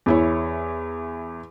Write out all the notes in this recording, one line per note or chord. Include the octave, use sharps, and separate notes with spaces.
E2 E4 C#5